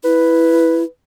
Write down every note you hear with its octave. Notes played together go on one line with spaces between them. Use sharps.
E4 B4